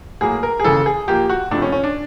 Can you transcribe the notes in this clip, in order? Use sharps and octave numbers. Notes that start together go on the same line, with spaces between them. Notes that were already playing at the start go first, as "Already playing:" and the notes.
A2 F#3 A#3 G#4
A#4
G#4
D#2 C#3 E3 A4
G#4
A#2 F3 A#3 G4
F#4
C#2 C3 F3 A3 D4
C#4
C#4
D4